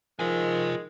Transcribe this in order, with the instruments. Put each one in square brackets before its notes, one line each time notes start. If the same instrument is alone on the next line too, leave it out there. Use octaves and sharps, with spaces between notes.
[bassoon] D#3 [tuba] F3 [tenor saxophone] G#3 [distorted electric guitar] F4 G#5